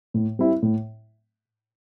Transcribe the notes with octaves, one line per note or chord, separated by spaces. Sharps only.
A2
G3 C4 E4
A2